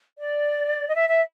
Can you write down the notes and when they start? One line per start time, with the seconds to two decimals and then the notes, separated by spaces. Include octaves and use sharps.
0.18 D5
0.88 D#5
0.95 E5
1.08 E5